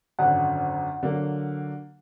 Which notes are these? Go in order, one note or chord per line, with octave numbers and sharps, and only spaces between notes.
G#1 F#2 D3 F#5
D3 F#3 A#3